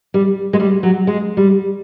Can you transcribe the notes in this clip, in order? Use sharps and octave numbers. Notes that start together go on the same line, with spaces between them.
G3
G#3
G3
F#3
G#3
G3